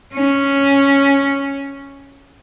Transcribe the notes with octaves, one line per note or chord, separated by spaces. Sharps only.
C#4